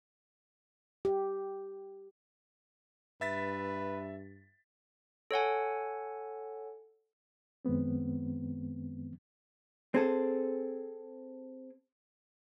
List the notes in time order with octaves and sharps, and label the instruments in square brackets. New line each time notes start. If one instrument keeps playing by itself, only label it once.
[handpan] G4
[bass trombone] G2 [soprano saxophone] B4 [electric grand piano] E5 A6 B6
[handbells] A4 C#5 F#5 G#5
[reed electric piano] F#2 D#3 G#3 B3 C4
[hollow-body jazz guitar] C4 G#4 A4